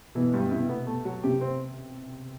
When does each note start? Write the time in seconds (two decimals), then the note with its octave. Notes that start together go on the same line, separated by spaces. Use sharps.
0.15 B2 E3
0.34 G2
0.51 C3 E4
0.69 B3
0.87 A3
1.05 F#3
1.23 C3 G4
1.41 C4